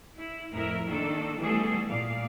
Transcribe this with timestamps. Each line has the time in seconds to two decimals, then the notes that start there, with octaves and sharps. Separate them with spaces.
0.17 E4
0.54 F2 A2 E4 A#4 E5
0.88 D#3 A#3 D4 A4
1.39 E3 G3 A3 B3 G#4 A4
1.88 A#2 D5 F5